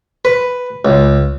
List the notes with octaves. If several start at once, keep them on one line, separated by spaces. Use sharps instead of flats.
B4
C#2